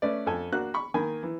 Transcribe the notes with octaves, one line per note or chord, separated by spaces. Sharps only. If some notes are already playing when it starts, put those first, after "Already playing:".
A3 C#4 B4 D5
F2 A4 G#5
A#3 D4 F#4 F#6
B5 C#6
D#3 A#3 G#5 B5
E3